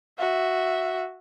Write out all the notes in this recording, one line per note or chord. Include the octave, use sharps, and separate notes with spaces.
F#4 E5